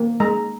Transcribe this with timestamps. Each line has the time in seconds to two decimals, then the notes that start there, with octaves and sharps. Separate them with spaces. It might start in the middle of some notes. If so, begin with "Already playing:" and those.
Already playing: A#3
0.20 G#3 A#5